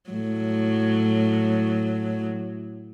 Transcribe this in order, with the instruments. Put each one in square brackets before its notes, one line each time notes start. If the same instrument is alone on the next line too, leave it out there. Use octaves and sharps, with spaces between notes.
[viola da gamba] A2 F#3